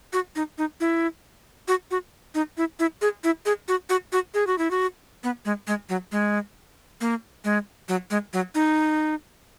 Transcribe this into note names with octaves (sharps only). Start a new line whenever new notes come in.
F#4
D#4
D#4
E4
F#4
F#4
D#4
E4
E4
G#4
E4
G#4
F#4
F#4
F#4
G#4
F#4
E4
F#4
B3
G#3
G#3
F#3
G#3
A#3
G#3
F#3
G#3
F#3
D#4